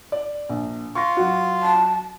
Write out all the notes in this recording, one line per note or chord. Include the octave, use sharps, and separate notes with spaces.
D5
A#1
F4 C#6 A#6
F#3 F#4
A5